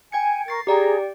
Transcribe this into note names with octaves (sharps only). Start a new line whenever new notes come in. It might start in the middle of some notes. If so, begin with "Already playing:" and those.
G5 G#5 G#6 C#7
A#4 C#6 A6 C7
G4 G#4 D5 G5 A#5